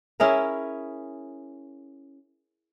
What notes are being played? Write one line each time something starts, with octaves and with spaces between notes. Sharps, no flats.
C#4 E4 G#4 A#4